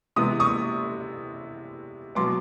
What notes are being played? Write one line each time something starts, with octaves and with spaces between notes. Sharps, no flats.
C3 E3 G#3 B3 D#6
C#6 D#6
B2 F#3 B3 C6 D6